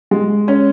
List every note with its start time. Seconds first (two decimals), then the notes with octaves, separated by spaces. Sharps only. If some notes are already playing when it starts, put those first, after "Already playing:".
0.11 G#3
0.48 C#4